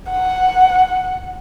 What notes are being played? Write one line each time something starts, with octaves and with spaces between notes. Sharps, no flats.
F#5